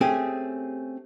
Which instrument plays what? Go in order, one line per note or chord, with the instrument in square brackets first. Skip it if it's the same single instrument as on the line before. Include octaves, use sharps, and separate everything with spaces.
[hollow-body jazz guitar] A3 C4 C#4 G4 G#4